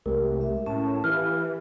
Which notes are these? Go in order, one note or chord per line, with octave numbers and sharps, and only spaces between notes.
C2 G#3 A3 G4 A#4
E5
A2 C#4 A5
E3 G4 B4 F5 F6